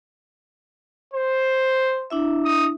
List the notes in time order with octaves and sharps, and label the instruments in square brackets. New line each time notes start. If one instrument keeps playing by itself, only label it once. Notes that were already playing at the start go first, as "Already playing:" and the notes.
[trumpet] C5
[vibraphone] D4 E4 E5
[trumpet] D#6